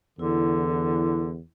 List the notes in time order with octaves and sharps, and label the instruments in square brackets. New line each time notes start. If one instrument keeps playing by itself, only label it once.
[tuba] E2 [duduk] D3 [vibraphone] E4